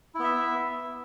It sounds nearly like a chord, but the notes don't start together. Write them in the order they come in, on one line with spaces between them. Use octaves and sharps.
E4 B3 E5